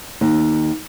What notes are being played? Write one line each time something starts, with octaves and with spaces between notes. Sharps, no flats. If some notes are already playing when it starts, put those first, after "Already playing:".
D#2